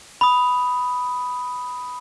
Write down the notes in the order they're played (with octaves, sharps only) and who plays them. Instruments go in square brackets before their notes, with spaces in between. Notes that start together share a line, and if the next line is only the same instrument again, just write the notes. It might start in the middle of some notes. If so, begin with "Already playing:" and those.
[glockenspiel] B5 D#6